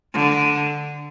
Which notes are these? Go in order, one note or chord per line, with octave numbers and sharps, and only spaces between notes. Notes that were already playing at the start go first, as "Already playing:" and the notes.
D3